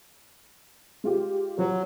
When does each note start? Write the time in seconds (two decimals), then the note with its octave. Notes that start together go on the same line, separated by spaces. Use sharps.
1.04 G#3 F4 G4
1.59 F3 F#3